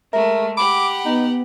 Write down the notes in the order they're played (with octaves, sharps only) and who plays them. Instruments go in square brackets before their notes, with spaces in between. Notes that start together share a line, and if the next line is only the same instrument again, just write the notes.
[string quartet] G#3 A3 [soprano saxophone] A#4 [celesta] E5
[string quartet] G4 F#5 [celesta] B5 [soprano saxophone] D6
[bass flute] B3 [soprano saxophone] D#4